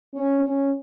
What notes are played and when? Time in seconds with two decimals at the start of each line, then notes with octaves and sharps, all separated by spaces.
0.14 C#4
0.42 C#4